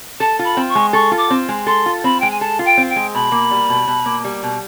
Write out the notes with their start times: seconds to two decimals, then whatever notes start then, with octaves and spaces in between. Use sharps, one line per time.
0.20 A4 A5
0.39 F4
0.45 B5
0.57 C4
0.69 C#6
0.75 G#3
0.93 A4 C#6
1.12 F4
1.18 D6
1.30 C4
1.48 G#3
1.67 A4 C6
1.86 F4
2.04 C4 B5
2.20 G#3 G5
2.31 G#5
2.41 A4 A5
2.59 F4
2.65 G5
2.78 C4
2.90 G5
2.96 G#3
3.14 B2 B5
3.32 A#3
3.51 G3
3.69 B2
3.88 B2
4.06 A#3
4.24 G3
4.43 B2